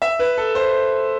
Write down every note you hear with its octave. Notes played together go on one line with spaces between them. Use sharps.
E5
B4
A4
C5